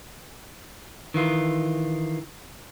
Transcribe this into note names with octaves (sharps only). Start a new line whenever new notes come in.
D#3 E3 F4